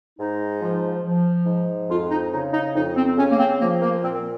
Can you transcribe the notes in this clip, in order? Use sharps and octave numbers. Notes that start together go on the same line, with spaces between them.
G#2 D#4
F3
F3
G#2
F2 F4
D#4
C#3 D#4
D#4
F2 D#4
C4
C#3 C#4
A#3
C4
F3 A#3
A#3
A#2 C4